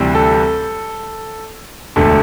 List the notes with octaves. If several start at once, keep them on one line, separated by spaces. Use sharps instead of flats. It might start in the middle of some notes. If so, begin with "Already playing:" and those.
Already playing: D2 C3 E3 G3 C4
A4
E1 D2 D3 A3 A4